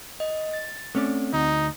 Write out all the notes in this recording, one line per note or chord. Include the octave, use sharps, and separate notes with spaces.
D#5
A6
A3 C4 C#4 D5
D2 D#4